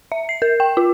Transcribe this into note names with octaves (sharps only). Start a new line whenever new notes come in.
E5
C7
A#4
G5
F4